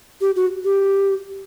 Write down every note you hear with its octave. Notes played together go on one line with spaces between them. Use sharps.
G4
F#4
G4